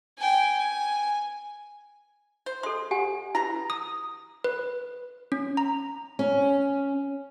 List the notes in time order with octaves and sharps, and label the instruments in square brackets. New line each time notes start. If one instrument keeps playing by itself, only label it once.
[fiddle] G5 G#5
G#5
[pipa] C5
[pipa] G#3 [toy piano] A4 C6
[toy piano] G4 F#5 G#5
[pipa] B2 A#5 [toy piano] E4
[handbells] D#6
B4
C#4
A#5
[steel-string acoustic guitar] C#4